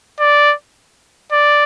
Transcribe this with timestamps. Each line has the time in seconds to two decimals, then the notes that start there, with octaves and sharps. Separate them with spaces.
0.20 D5
1.32 D5